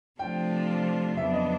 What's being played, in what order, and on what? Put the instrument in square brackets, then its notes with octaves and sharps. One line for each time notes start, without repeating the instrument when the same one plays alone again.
[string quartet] C3 F3 A3 D4 F4 [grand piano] G5
[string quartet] F2 C#3 F#3 B3 D4 [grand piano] E5
[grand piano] D#5